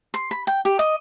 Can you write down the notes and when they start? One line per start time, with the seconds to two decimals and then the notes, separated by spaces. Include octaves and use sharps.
0.14 C6
0.31 B5
0.47 G5
0.65 G4
0.79 D#5